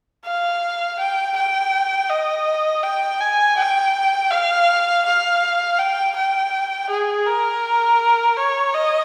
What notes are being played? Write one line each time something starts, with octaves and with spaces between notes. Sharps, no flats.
F5
G5
G5
D#5
G5
G#5
G5
F5
F5
G5
G5
G#4
A#4
C#5
D#5